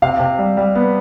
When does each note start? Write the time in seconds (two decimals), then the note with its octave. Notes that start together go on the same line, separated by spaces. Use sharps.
0.02 C3 F5
0.19 C3
0.38 G3
0.57 G3
0.75 B3